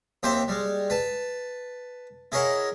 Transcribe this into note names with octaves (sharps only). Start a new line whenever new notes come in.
D#2 C4 G4 C5 E5 G5
G3 G#3
B4 A5
E4 G#4 A#4 C#5 D#5 F#5